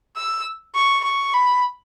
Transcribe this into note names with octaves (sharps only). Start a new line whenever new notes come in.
E6
C#6
C#6
B5